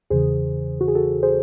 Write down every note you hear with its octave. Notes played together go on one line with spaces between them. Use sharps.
E2 C#3 E3 G#4 C5
F#4
G#4
F#4 A4
G#4 C5